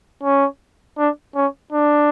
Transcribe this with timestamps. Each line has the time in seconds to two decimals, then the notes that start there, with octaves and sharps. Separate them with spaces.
0.23 C#4
0.98 D4
1.35 C#4
1.73 D4